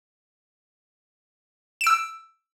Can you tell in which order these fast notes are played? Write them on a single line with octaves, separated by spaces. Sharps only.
E7 D7 E6